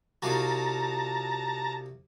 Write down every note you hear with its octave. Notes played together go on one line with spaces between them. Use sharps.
C2 F4 F#4 A5 A#5